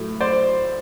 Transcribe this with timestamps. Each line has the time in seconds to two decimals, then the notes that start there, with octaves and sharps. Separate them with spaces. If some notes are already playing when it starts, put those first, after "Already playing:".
Already playing: A2 F#3 A3
0.21 C5 D5